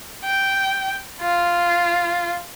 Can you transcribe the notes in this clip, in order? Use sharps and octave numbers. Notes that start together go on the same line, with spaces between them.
G5
F4